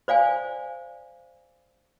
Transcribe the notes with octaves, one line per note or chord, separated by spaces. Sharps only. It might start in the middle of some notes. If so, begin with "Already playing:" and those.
C5 D5 F5 G#5